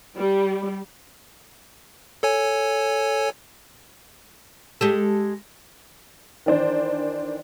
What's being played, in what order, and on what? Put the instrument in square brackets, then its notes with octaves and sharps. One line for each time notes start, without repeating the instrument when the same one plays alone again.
[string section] G3
[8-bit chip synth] A4 C#5 G#5
[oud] G#3 G4 A4
[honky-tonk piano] D#3 E3 D4 C5